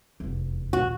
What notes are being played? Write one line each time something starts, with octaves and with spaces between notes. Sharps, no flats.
F1 E2
A#1 D#2 F#4